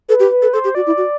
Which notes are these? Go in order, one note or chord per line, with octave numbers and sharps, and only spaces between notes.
A4 B4
G4
B4
A4
A4 C5
G4
F#4 D5
E4
F#4